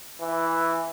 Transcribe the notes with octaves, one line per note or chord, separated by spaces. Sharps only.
E3